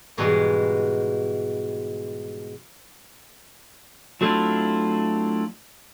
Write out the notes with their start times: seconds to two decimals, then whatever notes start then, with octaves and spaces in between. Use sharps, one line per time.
0.17 G#2 B2 E3 G3 G#3 B3
4.21 F#3 A3 C4 D4 E4 F4